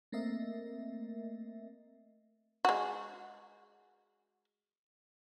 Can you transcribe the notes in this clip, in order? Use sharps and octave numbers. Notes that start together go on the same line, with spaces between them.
A3 A#3 C4 A#4 D#5 E5
G#3 F#4